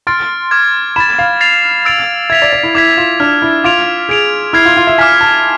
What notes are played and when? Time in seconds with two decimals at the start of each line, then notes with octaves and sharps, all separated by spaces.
0.07 C6 F6 A6 D7
0.51 D6 F6 G#6
0.96 B5 A6 E7
1.19 F5
1.41 A6 C7 F7
1.85 E6 A6 D7 F7
2.30 E5 G#6 B6 F7
2.42 D5
2.53 D5
2.63 E4
2.75 E4 D6 G#6 B6
2.97 F4
3.20 D4 F6 B6 F7
3.42 E4
3.64 F4 D6 G#6 D7 F7
4.09 G#4 G#6 D7 F7
4.53 E4 F6 G#6 C7
4.65 F4
4.77 F4
4.87 E5
4.98 G#5 D6 F6 B6
5.21 A5